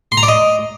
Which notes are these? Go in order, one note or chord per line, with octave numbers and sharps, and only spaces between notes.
C6
A#5
D5
D#5